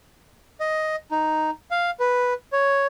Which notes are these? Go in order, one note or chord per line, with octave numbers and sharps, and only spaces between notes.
D#5
D#4
F5
B4
C#5